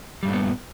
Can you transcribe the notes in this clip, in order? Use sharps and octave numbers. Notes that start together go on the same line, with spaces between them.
G2 A#2 G3 A3 B3